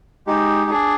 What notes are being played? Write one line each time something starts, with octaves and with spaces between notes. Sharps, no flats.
G#3 D#4 G4
D4 G#4